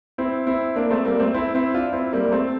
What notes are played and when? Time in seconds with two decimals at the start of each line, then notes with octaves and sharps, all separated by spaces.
0.18 C4 E4
0.47 C4 E4
0.76 A#3 D4
0.91 A3 C4
1.05 G3 A#3
1.20 A3 C4
1.34 C4 E4
1.55 C4 E4
1.74 D4 F4
1.93 C4 E4
2.13 G3 A#3
2.32 A3 C4